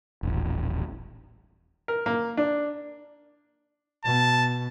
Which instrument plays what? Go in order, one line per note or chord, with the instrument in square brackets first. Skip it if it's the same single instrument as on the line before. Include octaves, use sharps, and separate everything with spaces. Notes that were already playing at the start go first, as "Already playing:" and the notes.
[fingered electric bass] D#1 A1
[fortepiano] A#4
A#3
D4
[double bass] B2 [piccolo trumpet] A5